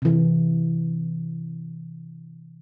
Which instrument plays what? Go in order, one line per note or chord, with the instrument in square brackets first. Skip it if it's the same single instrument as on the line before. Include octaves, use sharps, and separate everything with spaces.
[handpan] C3 E3